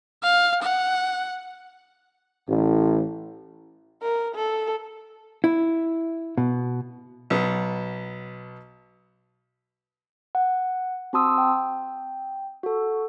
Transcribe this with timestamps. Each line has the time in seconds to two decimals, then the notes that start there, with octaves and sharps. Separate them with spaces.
0.23 F5
0.62 F#5
2.48 A1
4.02 A#4
4.35 A4
5.44 E4
6.38 B2
7.30 B1 B3
10.35 F#5
11.13 C4 F#4 A5 C6 D#6 E6
11.38 G5
12.63 F#4 A4